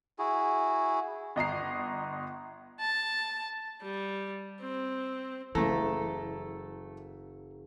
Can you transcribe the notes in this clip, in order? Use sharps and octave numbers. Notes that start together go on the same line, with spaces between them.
E4 F#4 G#4
G1 D#5 A#5 C7
A5
G3
C4
F#1 E3 A3 A4 A#5